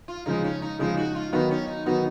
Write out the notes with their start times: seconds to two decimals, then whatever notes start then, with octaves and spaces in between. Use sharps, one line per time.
0.08 F4
0.26 C#3 F3 G#3 D#4
0.44 C#4
0.62 D#4
0.79 C#3 F3 G#3 D#4
0.97 F#4
1.15 F4
1.33 D#3 F#3 B3 D#4 F#4 B4
1.51 C#4
1.68 D#4
1.86 D#3 F#3 B3 D#4 F#4 B4